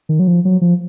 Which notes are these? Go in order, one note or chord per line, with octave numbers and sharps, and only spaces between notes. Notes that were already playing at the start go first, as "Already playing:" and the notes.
D#3
F#3
F3
F#3
F3